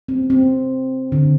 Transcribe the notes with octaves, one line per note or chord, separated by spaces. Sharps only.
C4
C4
D3